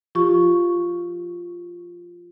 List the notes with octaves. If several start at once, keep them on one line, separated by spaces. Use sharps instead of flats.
F3 F4 G4 C#6